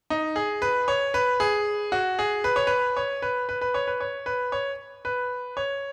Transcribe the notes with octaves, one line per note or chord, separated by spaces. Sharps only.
D#4
G#4
B4
C#5
B4
G#4
F#4
G#4
B4
C#5
B4
C#5
B4
B4
B4
C#5
B4
C#5
B4
C#5
B4
C#5